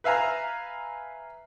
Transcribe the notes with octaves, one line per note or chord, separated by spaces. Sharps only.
B4 E5 F5 G#5 A#5